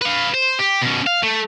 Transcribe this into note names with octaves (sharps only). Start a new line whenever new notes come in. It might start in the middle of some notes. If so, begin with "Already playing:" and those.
B4 F5
C5
G4
B2 C#4
F5
A3